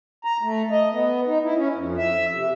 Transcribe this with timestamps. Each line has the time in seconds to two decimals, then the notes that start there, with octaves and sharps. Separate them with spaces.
0.24 A#5
0.43 A3
0.71 D#5
0.92 B3
1.27 D#4
1.43 E4
1.57 C#4
1.75 F2
1.97 E5
2.34 C3